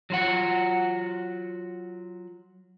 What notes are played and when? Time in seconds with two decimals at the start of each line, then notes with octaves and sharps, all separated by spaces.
0.10 F#3 F4 F#5